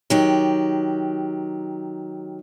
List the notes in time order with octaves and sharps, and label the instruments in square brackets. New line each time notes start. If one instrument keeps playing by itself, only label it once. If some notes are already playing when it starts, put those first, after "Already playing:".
[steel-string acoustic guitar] D#3 F#3 G4